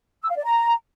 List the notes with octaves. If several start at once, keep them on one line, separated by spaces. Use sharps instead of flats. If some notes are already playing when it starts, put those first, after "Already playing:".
E6
F5
D5
A#5